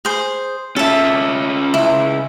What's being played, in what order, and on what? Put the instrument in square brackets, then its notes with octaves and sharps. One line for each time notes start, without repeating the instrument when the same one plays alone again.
[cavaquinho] G#4 C5
[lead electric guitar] C#4 F4 [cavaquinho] A4 E5
[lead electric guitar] C#2 [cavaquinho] E4